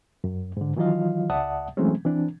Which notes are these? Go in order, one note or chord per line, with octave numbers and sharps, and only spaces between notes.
F#2
G#2 D3
D#3 E3 F#3 F4 D#5 F5
C#2 D5 E5 F#5 A5 D#6
E3 F#3 G#3 A3 C4 C#4
E3 C4 D4